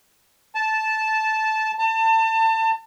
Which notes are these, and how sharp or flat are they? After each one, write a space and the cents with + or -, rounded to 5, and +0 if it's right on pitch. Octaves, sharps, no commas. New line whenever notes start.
A5 -10
A5 +30